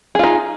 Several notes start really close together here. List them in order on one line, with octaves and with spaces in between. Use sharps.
G#4 F4 D#4